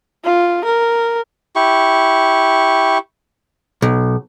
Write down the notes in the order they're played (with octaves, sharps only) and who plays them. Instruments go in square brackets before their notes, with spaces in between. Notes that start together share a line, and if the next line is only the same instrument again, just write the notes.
[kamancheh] F4
A#4
[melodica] E4 G4 C#6
[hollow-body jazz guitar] B1